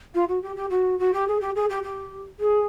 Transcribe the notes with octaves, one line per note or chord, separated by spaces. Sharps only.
F4
F#4
G4
G4
F#4
F#4
G4
G#4
G4
G#4
G4
G4
G#4